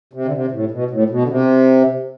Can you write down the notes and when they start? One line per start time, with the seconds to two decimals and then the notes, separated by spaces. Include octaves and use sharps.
0.13 C3
0.25 D3
0.33 C3
0.51 A2
0.71 B2
0.90 A2
1.10 B2
1.23 D3
1.29 C3